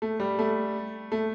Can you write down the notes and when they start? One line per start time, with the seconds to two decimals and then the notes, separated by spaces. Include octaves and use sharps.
0.02 A3
0.20 G3
0.39 A3
1.12 A3